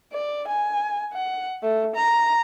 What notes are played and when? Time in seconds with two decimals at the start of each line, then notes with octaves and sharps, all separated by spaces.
0.13 D5
0.48 G#5
1.13 F#5
1.62 A3
1.96 A#5